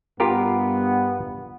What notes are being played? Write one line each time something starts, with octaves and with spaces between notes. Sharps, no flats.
G2 B3 F4 G4 A#4